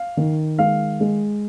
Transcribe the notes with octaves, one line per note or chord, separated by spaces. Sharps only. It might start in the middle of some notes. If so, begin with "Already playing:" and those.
Already playing: F5
D#3
G#3 F5
G#3